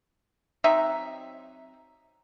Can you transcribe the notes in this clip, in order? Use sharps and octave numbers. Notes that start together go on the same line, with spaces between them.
F#3 C4 D#4 E5